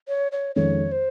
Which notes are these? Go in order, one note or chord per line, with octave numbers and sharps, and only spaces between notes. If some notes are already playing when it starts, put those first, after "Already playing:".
C#5
C#5
F2 D#3 G#3 C#4 C#5
C5